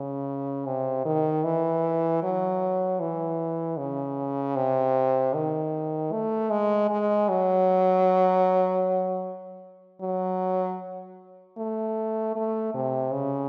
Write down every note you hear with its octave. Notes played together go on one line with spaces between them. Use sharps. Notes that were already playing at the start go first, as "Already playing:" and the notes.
Already playing: C#3
C3
D#3
E3
F#3
E3
C#3
C3
D#3
A3
G#3
G#3
F#3
F#3
A3
A3
C3
C#3